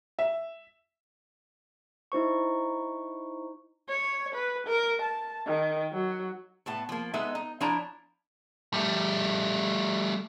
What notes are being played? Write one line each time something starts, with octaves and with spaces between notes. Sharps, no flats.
E5
D#4 E4 C5 C#6
C#5
B4
A#4
A5
D#3
F#3
A2 B3 A5
F3 A#3
G#3 B3 D#4 A4 E5
D#4
F3 D4 E4 C#5 A5 A#5
G3 A3